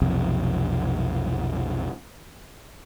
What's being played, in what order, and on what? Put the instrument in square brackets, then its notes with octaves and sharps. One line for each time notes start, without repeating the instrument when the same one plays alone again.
[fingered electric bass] B1 F2 C3